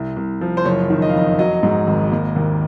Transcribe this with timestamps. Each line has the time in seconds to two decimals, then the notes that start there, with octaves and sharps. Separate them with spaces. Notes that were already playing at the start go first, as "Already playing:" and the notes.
Already playing: C2
0.17 C2
0.41 F3
0.57 C5
0.65 F#1 C#5
0.90 D#3
1.02 D#5
1.09 F5
1.15 F2 D#5
1.38 F#3 D#5
1.63 G#2
1.87 G#1
2.12 A#3
2.36 D#2